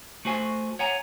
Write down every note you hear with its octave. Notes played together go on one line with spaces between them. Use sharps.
A3 F#4 C5 G#5
C#5 F#5 G#5 A#5